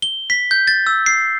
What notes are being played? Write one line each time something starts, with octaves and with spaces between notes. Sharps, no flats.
G7
B6
G6
A6
E6
C7